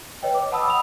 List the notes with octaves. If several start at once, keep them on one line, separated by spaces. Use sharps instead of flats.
B4 C#5 D#5 G5
D6
F#5 A5 B5 D#6 E6
B5 D#6 E6 F7